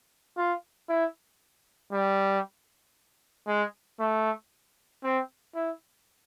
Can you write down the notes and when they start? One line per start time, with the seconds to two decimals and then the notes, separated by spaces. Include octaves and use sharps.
0.37 F4
0.89 E4
1.93 G3
3.47 G#3
3.99 A3
5.04 C4
5.55 E4